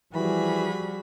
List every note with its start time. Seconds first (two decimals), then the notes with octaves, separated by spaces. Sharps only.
0.14 E3 F3 G3 F#4 G#4 B5